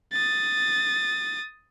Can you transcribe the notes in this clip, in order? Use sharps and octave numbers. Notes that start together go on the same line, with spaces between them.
D#6 A6